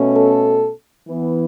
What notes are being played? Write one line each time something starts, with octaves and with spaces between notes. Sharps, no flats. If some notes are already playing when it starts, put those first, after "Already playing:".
Already playing: B2 A3 C#4
A4
E3 B3